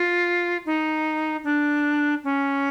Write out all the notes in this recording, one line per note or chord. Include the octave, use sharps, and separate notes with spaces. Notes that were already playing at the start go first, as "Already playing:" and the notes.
Already playing: F4
D#4
D4
C#4